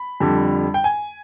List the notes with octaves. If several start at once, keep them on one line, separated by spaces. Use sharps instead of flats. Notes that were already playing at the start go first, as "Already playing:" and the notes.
Already playing: B5
F2 D3 G3
G5
G#5